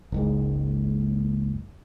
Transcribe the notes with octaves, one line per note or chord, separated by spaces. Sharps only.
F#1 C#2 G#2